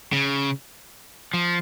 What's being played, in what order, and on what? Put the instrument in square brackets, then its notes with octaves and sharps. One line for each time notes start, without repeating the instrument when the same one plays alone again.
[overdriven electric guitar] C#3
F3